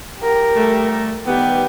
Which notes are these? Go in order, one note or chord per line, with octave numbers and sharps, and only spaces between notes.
G4 A#4
G3 A3
D#3 G3 B3 G4 B4